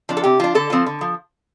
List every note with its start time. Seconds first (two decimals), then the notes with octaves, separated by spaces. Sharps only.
0.09 F3 D4
0.17 A4
0.23 C3 G4
0.39 F3 D4 F4
0.55 D3 A4
0.70 F3 C4 F4
0.86 D3
1.01 F3